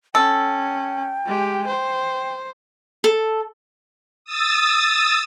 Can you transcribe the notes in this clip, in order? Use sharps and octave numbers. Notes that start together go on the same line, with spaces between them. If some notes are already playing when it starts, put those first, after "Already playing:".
C#4 A4 G5
G#3 G4
C5
A4
D#6 E6 A6